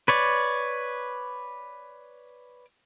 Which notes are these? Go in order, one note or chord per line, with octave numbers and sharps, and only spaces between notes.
B4 C#5 D5